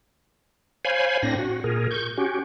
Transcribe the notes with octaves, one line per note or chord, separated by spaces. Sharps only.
C5 C#5 F5 G#5 B5
A2 C4 D4 A#6
F#4
A#2 G#4 A#4
C#6 G6
C#4 F#4 G4